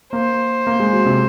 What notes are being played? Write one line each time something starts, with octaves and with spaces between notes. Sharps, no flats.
A#3 C5
A#3
G#3
F#3
C3